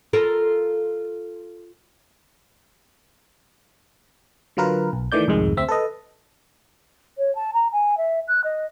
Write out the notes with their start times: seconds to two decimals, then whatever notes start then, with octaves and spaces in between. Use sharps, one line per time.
0.13 F4 A4 A#4
4.57 D3 F#3 F4 A#4 B4
4.93 B1
5.12 D#3 E3 A3 D5 G6
5.28 C2 F2 G#2 D#3 G#3
5.57 D2 C4 E5
5.68 A4 B4 D#5
7.18 C#5
7.35 A5
7.54 A#5
7.72 G#5
7.98 E5
8.28 F#6
8.44 D#5